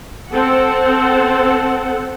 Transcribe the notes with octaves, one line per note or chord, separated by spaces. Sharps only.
C4 A4 F#5